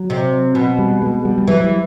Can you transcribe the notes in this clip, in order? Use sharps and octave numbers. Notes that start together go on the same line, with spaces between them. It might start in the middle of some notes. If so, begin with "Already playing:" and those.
Already playing: F#3
C3
B2
G3
G#3
G3
G3
E3 F#3
G3